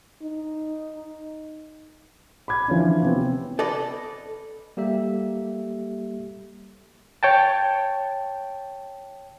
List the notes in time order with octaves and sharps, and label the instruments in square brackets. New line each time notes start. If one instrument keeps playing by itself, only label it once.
[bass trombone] D#4
[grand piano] B5 D6 G#6
E3 F3 C#4 D4
C3 B3 C4
[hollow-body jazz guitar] A4 B4 D5 D#5
[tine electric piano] G3 A#3 G4 A4 E5
[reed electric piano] C#5 G5 A5